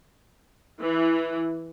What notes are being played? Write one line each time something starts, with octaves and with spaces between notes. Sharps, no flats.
E3